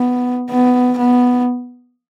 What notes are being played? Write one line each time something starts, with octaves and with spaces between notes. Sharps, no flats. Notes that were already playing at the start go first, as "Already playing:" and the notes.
Already playing: B3
B3
B3